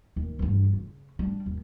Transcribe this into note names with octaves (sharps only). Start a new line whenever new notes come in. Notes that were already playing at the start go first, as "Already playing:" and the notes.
D#2
G2 E3
C#3
G3 D4
D#2